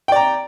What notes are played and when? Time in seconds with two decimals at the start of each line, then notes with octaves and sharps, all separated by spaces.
0.08 G5
0.12 D5
0.16 A#5